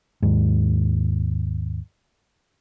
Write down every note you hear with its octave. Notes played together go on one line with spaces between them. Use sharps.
D#2 G#2